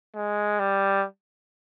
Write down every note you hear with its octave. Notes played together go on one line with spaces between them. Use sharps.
G#3
G3